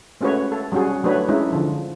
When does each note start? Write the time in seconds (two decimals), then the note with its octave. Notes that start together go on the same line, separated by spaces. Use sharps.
0.21 G#3 A3 C#4 F#4 B4 C#5
0.52 A4
0.72 F#3 G3 C#4 F#4 G#4
1.04 F#3 A3 D4 B4 C#5
1.29 G#3 C#4 D#4 E4
1.52 D3 F3